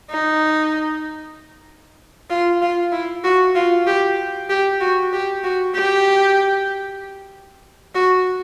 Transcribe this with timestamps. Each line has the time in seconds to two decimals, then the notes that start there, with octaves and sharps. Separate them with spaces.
0.11 D#4
2.30 F4
2.62 F4
2.92 E4
3.24 F#4
3.55 F4
3.87 G4
4.49 G4
4.80 F#4
5.13 G4
5.44 F#4
5.75 G4
7.95 F#4